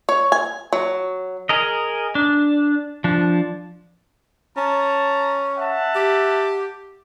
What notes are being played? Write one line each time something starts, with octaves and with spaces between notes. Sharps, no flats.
C#5
G#5
F#3
G#4 A#4 D#5
D4
F3 D4
C#4 A5 A#5
E5 F#5 A5
G4